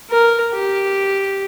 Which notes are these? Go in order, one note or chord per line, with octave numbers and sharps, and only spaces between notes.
A#4
G4